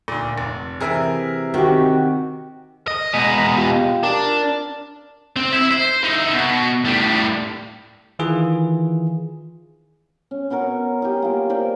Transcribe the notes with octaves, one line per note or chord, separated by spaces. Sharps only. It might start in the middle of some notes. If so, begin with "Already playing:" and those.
D2 A#2
F1
C3 E3 G#4 A#4 E5
D#3 C4 F#4 G4
D#5
B2 G#3 A#5 B5 D#6
F4 G4
D4 A#4
C4
E4 E5
C5
D#4 E4
B2
A2 G3
D#3 E3 F4 G#4
C#4
B3 C#4 F#4 A#4
G4 G#4 D#5
A#3 F4
A#4 C5 D5